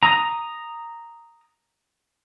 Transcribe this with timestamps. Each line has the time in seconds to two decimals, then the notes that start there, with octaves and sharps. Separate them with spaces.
0.03 A#5 D#6